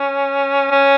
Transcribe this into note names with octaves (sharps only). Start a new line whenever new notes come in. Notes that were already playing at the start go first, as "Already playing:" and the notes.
Already playing: C#4
C#4